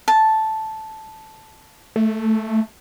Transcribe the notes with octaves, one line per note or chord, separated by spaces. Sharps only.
A5
A3